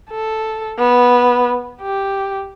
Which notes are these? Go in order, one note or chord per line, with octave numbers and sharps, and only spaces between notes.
A4
B3
G4